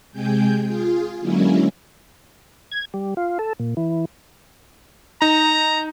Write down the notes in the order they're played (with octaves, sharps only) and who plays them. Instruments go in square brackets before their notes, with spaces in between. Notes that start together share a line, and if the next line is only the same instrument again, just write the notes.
[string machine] C3 G#3 G5 G#5 G6
F4 G#4
D3 F#3 G#3 A#3 C#4 E4
[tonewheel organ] G#6
G3
F4
A4
A#2
E3
[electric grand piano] D#4 [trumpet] A#5